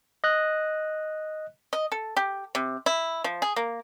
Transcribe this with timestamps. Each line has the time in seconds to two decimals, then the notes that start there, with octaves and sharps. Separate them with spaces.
0.24 D#5 F#6
1.73 D#5
1.92 A4
2.17 G4
2.55 C3
2.86 E4
3.24 F3
3.42 G#4
3.56 A#3